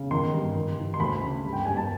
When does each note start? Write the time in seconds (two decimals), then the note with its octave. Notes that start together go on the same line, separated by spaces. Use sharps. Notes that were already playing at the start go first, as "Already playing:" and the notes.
Already playing: C#3
0.11 D#3 C6
0.33 G2
0.55 D#3
0.78 D#3
0.94 C6
1.00 D2 B5
1.22 C#3
1.45 G2
1.53 G5
1.65 G2 G#5
1.77 A5